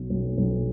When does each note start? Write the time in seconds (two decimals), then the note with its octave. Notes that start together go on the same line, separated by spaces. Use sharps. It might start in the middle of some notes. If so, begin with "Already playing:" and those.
Already playing: B1 B2
0.10 B1
0.38 B1